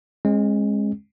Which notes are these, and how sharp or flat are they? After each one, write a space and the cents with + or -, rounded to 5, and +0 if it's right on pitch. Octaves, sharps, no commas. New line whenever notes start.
G#3 +0 C#4 -40